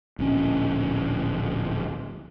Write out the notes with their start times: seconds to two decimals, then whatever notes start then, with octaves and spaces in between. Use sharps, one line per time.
0.19 D1 A#1 C#4